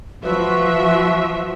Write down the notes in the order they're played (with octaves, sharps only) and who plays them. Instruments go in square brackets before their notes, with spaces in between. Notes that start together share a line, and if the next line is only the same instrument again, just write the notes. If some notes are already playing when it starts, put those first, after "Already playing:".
[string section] F3 [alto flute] F#4 [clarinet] B4 [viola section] E5